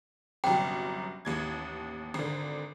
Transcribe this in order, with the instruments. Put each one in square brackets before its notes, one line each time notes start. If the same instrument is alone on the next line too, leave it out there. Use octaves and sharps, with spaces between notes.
[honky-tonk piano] G1 C2 F#2 [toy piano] G5
[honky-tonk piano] A1 D#2 G#6
G#1 D3